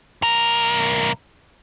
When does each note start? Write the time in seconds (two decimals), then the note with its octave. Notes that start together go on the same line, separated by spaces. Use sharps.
0.22 B1 A#4